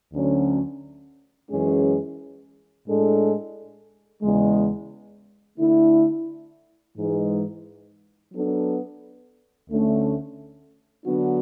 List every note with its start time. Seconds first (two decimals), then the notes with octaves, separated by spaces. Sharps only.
0.13 D2 D3 F#3 C#4
1.50 F#2 E3 G#3 C#4 G#4
2.87 A2 G#3 D4 A4
4.22 E2 C#3 G#3
5.58 D3 A3 E4
6.95 G#2 E3 G#3
8.32 F#3 B3 D4 A4
9.68 D2 D3 A3 C#4
11.05 D3 F#3 B3 D4 F#4